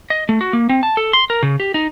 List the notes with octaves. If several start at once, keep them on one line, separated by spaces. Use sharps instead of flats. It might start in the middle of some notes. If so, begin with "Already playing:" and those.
D#5
A3
F#4
A#3
C4
A5
A4
C6
A#4
C#3
G4
D#4